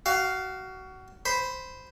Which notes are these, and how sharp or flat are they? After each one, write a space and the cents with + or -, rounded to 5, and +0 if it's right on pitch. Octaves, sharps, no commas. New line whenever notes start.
F#4 +25 F5 +0
C5 -5 B5 +0